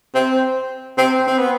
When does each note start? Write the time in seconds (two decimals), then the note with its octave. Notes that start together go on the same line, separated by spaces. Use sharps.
0.15 C4
0.98 C4
1.27 C4
1.39 B3